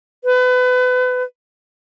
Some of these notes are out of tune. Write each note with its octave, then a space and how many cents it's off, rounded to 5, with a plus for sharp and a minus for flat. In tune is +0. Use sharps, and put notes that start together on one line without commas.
B4 +30